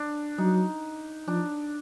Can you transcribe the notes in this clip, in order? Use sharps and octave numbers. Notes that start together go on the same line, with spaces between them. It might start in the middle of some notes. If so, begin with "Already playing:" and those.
Already playing: D4
F#3 D#4
F3 D4